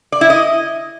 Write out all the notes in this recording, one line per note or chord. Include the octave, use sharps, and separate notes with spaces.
D5
E4
D#5